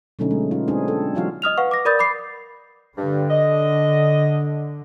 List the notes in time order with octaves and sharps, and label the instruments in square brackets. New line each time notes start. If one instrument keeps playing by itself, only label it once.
[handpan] B2 D3 F#3 A3 C#4 D#4
G#3
B3 D#4 F4
G#3 C4 D4 D#4 G#4
A4
E3 F#3 F4 F#4 F5
[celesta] D#5 D#6 F6 F7
B4 F5 F#5 C#6
D6 A#6
A#4 D5 B5 D#6 G6 A6
B5 D6 C7
[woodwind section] G2 [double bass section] D3
[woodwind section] D#5